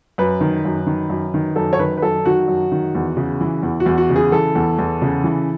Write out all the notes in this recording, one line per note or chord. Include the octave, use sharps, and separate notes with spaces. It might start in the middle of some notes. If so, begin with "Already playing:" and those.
F#2 B4
D#3
F#2
D#3
F#2
D#3
F#2 A4
C#5
D#3 B4
B4
F#2 A4
D#3 F#4
F#2
D#3
E2
C#3
E3
E2
F#4
E2
F#4
C#3
G#4
E3 A4
E2
E2
C#3
E3